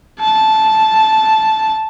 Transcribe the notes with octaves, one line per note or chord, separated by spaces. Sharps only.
A5